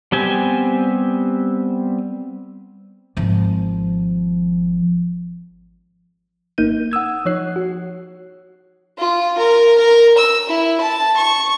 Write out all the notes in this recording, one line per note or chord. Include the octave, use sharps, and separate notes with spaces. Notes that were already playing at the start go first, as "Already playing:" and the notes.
G3 B3 C4 G4 G#5
G#1 F3
G#1 A#3 D#4 G6 D#7
F#5 D#6 E6 G#6
F3 D#4 C#5 F#6 C7
F#4
F4
A#4
A#4
E6
E4
A5
C#6